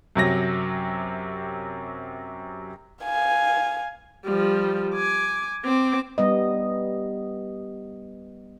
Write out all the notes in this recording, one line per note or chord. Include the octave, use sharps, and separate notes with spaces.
F#2 C3 F#3 A#6
F5 G#5
F3 G3
G#5 D6
C4 D6
G3 B3 D#5